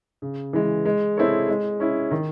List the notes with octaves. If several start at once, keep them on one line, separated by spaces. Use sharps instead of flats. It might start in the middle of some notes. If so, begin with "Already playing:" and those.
C#3
E3 G#3
G#3
C4 E4 A4 C#5
G#3
C#4 E4
D#3